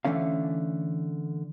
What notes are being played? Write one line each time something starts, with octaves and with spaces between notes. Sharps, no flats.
D3 E3 A3 C#4 F5